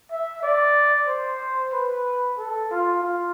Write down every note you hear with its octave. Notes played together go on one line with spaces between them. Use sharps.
E5
D5
C5
B4
A4
F4
F4